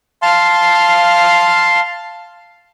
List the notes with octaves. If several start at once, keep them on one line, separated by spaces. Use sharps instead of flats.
F5 A5 C6 F6